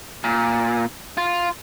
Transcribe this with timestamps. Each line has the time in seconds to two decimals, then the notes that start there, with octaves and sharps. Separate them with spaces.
0.24 A#2
1.17 F4